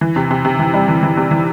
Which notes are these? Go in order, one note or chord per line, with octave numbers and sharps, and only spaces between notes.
E3
C3
C3
C3
E3
G3
E3
E3
C3
E3